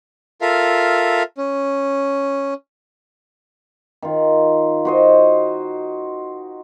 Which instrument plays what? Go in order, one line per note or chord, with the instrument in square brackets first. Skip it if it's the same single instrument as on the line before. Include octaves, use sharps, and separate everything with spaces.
[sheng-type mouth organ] F4 A4 A#4 E5 F5
C#4
[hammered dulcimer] D#3 F4
F#4 C5 D#5